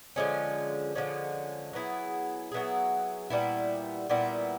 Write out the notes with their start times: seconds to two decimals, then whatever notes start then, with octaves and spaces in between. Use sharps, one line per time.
0.16 D3 F3 G#3 C#4
0.95 D3 F3 G#3 C#4
1.73 F#3 B3 E4 G#4
2.52 F#3 B3 E4 G#4
3.30 A#2 G3 B3 E4
4.09 A#2 G3 B3 E4